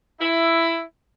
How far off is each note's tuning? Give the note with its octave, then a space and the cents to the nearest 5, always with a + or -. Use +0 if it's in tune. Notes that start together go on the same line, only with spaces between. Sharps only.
E4 +10